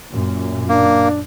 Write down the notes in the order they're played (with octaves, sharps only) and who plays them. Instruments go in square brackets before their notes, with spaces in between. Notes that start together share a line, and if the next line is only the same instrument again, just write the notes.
[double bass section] F#2 A#2
[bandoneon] A#3 [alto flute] D4